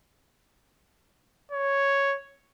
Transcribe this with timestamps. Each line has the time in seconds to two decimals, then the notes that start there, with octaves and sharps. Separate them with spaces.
1.52 C#5